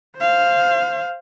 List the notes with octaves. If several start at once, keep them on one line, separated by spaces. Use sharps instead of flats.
C5 F5